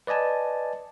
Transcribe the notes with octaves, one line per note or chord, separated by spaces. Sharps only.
B4 D5 D#5 G#5 A5